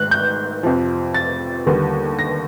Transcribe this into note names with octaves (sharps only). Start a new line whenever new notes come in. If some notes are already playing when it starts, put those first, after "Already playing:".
Already playing: G#2 D#3 F#6
G6
F2 C3 F3
A6
D#2 D3 G3 B3
A#6